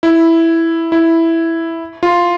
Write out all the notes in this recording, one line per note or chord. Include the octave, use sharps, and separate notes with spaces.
E4
E4
F4